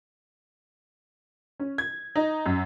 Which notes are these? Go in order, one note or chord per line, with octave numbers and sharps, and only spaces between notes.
C#4
G#6
D#4
F#2